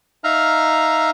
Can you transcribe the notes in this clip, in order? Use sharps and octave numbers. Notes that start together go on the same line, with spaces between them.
D#4 E5 F5 A#5 F6